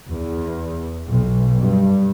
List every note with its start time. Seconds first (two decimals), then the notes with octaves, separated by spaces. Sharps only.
0.11 E2
1.08 B1
1.60 G2